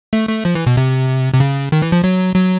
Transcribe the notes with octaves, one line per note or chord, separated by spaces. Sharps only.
A3
A3
F3
E3
B2
C3
C3
C#3
D#3
E3
F3
F#3
F#3